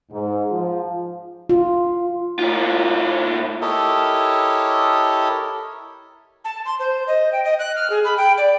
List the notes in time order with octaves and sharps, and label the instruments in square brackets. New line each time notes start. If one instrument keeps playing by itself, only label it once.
[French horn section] G#2
F3
[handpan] F4
[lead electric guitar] A2 F4
[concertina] E4 G4 A4 A#4 C#5 D#5
[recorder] A5
C6
C5
D#5
G5
D#5
F#6
F6
G#4
B5
G5
D5